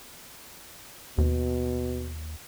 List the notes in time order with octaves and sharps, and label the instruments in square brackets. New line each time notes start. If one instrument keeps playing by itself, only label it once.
[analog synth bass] D#2 [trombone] B2